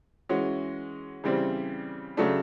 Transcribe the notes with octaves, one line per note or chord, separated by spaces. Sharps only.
E3 G#3 C#4 F#4
C#3 E3 G3 C4
C#3 F#3 A3 D4